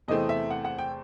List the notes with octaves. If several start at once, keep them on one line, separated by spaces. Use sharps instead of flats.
E2 C3 E3 A3 C4 D#5
E5
F#5
F#5
G5